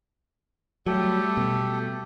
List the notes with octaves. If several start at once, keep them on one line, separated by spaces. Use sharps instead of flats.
F#3 G3 A3 G4 A4
B2